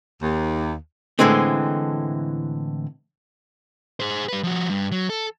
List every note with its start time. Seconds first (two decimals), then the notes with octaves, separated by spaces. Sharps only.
0.21 D#2
1.19 A2 D3 E3 G#3 C4
4.00 G#4 C5
4.29 G3 B4
4.44 F3 F#4
4.69 G2
4.92 F#3
5.10 A4